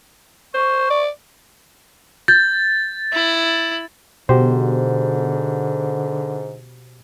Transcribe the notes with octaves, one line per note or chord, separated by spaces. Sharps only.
C5 C#6
D5
G6 A6
E4
G#2 B2 D3 F#4 G4 C5